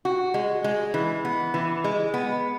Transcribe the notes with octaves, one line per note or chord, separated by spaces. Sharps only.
F#4
G#3
G#3
E3
B3
E3
G#3
B3